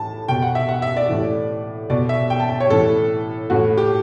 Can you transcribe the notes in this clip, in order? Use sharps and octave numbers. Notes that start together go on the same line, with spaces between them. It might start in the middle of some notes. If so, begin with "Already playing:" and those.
Already playing: A2 E3 A5
B2 G5
F#5
E5
F#5
E5
D5
A2 E3
B2 D5
E5
G5
A5
G5
C#5
A2 E3 A4
A2 E3 F#4
G4